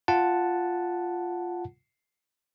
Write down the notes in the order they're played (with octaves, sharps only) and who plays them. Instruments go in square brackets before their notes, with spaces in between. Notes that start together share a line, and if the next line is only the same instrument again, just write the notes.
[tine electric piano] F4 F#5 A5